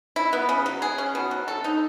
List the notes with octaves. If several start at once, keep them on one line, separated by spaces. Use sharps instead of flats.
E4
B3
C#3
F#3
G#4
C#4
B2
F#3
A4
D#4